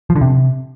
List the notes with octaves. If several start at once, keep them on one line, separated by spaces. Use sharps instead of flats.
F3
D3
C3